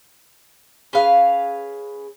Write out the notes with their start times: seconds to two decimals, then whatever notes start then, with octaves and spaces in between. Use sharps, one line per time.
0.93 C#4 G#4 B4 F5